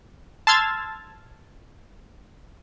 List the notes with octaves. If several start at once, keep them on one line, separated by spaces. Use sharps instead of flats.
A5 C6 E6 F6 G#6 A6